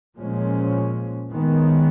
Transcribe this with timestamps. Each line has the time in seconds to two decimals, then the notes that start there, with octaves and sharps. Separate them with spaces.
0.16 A#2 F3 G#3 C#4
1.32 D#3 G#3 B3